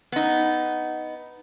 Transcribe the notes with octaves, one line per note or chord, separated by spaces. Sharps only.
B3 D#4